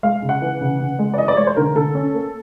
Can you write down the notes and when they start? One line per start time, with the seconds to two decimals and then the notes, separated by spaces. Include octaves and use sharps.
0.03 G#3 F5
0.22 C#3
0.29 F#5
0.42 E3
0.61 C#3
0.80 C#3
0.99 G#3
1.14 D5
1.18 E3 D#5
1.28 D5
1.37 G#3 C#5
1.47 C5
1.56 D3 A#4
1.75 D3 A4
1.95 C#4
2.14 A#3